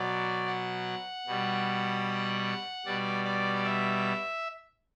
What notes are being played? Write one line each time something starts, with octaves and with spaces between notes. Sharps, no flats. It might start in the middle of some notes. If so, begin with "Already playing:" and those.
Already playing: B2 F#3 D5
F#5
B2 G3
B2 G3 D5
D5
E5